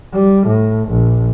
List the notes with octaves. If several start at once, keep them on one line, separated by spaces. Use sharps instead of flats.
G3
A2
A#1